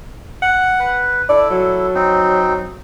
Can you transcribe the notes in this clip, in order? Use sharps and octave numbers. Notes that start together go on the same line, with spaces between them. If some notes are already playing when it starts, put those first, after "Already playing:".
F#5
B4
E4 A4 D5
F#3
C4 D#4